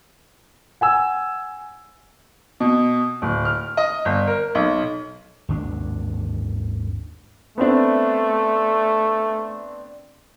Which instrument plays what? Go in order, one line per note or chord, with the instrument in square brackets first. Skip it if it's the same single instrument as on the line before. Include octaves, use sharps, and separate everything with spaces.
[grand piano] F#5 G#5 E6
B2
D1
F6
D#5
G1
A#4
B1
[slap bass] G#1 D#2 D4
[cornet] A3 [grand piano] B3 C4 D4